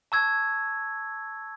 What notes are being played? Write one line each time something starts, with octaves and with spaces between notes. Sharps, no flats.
A5 C#6 E6 G#6